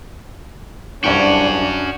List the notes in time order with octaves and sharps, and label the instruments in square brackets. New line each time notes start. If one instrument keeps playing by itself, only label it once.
[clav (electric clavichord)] C2 G2 G5 [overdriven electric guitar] C#4 F#4 [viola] D4